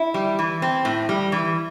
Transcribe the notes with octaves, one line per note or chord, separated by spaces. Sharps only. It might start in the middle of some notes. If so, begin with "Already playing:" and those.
Already playing: E4
G3
E3
C4
A2
G3
E3